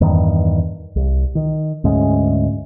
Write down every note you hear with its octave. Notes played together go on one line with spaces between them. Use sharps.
E2 G2 D#3
C2
D#3
D2 G#2 G#3 C#4